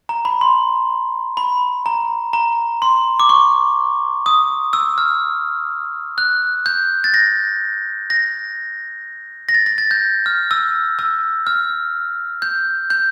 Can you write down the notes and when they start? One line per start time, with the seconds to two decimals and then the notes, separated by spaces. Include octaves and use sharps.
0.09 A#5
0.25 B5
0.41 C6
1.37 B5
1.86 A#5
2.33 A#5
2.82 C6
3.20 D6
3.29 C#6
4.26 D#6
4.73 E6
4.98 F6
6.18 F#6
6.66 G6
7.04 A6
7.14 A#6
8.10 A#6
9.49 A#6
9.54 A6
9.66 A#6
9.78 A6
9.91 G6
10.26 F6
10.51 E6
10.99 E6
11.47 F6
12.42 G6
12.90 G6